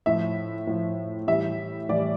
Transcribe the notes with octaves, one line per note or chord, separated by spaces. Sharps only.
A2 F3 E5
A2 F3
A2 E3 G3 E5
A2 E3 G3 D5